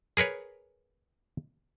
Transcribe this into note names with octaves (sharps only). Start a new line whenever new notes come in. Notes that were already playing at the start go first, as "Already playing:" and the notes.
G#4 A#4 B4 C#5